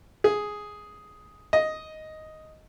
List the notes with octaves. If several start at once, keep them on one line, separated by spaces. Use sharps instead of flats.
G#4
D#5